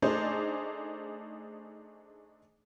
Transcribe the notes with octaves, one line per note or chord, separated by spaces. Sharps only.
A3 D4 D#4 G#4 C5